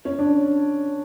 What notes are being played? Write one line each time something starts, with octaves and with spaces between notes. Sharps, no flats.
C#4
D4